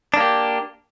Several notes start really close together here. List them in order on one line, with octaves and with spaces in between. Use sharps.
D4 A#3 G4